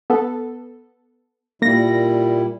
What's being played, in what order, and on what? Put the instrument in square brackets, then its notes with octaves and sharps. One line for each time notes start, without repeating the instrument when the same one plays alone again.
[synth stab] B3 A4
[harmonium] A#2 G3 E4 [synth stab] A#3 A#6